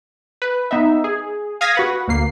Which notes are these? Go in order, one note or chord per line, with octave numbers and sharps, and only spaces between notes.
B4
B3 D#4 E5
G#4
F5 D#6 G#6 A#6 B6
F#4 B4 F#5
D2 A#3 C7